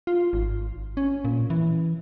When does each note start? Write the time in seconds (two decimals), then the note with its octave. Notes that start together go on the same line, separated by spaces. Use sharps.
0.07 F4
0.33 G#1
0.97 C#4
1.25 A#2
1.50 E3